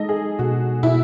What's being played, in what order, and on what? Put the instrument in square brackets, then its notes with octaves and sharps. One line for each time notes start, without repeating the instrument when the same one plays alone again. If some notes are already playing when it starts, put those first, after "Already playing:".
Already playing: [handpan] G#3 D#4 [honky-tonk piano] A4 D#5
[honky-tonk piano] G#4
[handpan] B2 [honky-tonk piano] F#4
[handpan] B2 [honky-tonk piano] E4